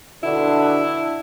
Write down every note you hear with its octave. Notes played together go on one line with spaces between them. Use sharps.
B2 D3 D4 E4